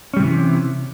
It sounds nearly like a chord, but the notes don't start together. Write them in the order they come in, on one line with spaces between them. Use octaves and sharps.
C#4 G3 C3 E3